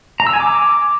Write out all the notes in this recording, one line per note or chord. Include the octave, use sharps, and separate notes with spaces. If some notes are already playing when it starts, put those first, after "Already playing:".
A#5
E6
G#5
D6